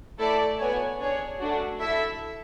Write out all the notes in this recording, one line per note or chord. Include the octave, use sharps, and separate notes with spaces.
A3 E4 A4 D5
B3 F#4 C#5 G#5
D4 G#4 C#5
A3 D4 F#4
E4 A4 E5